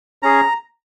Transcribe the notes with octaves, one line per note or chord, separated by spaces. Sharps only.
C#4 G#4 A#5